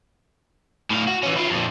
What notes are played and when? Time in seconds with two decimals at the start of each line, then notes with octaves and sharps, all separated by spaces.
0.90 A2 F5
1.07 F#4
1.23 E3 C#4
1.36 E4 F4
1.50 F2 A#2